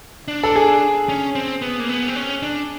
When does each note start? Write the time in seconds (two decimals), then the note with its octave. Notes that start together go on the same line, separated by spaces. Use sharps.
0.28 D4
0.43 A4
0.56 G#4
1.09 C#4
1.35 C4
1.62 B3
1.80 A#3
1.89 B3
2.08 C4
2.16 C#4
2.43 D4